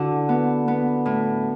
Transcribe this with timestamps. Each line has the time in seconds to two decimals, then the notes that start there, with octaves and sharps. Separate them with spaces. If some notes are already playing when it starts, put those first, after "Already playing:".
Already playing: D3 D4 E4 F#4
0.29 B3
0.68 B3
1.06 A2